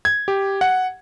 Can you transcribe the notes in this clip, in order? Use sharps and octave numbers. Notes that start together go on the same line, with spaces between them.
G#6
G4
F#5